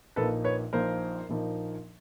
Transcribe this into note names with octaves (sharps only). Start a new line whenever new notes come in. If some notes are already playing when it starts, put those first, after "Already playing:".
A#1 A#2 F3 A#3 D#4 A4 B4
B4 C#5
A#1 A#2 F3 A#3 D#4 A#4 C5
A#1 A#2 F3 A#3 D#4